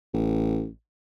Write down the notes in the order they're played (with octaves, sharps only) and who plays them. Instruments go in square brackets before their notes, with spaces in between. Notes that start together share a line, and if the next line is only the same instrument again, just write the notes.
[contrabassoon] A1